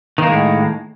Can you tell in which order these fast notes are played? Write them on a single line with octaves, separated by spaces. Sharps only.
D#3 A#3 G#3 A2